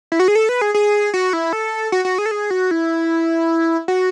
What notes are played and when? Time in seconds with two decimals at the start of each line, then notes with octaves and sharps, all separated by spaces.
0.12 E4
0.20 F#4
0.28 G#4
0.35 A4
0.49 B4
0.62 G#4
0.74 G#4
1.14 F#4
1.33 E4
1.53 A4
1.92 F#4
2.05 F#4
2.18 G#4
2.26 A4
2.31 G#4
2.51 F#4
2.71 E4
3.88 F#4